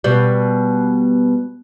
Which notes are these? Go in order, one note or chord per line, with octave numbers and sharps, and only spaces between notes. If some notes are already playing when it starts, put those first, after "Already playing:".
B2 G3